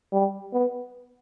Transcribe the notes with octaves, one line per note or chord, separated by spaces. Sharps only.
G3
B3